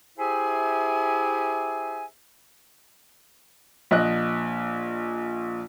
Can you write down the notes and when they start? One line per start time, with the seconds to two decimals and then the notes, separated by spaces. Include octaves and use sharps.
0.18 E4 G4 G#4 C5 E5 G#5
3.91 A#1 D#5 F#6